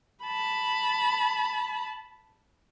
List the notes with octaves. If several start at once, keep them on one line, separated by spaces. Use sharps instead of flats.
A5 B5